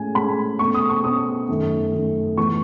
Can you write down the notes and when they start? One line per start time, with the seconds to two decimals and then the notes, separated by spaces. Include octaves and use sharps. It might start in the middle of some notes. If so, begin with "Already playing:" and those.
Already playing: A2 G#3 C#4 G#5
0.15 A2 G#3 C#4 B5
0.59 B2 A3 C#4 C#6
0.74 D#6
0.90 C#6
1.04 B2 A3 C#4 D#6
1.49 F#2 D#3 A3
1.93 F#2 D#3 A3
2.37 A2 E3 B3 C#6